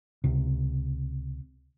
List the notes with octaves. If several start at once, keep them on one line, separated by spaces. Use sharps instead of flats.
C#2 C3